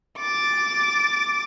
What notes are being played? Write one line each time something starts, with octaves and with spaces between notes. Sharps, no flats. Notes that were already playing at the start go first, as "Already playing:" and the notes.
D6 A6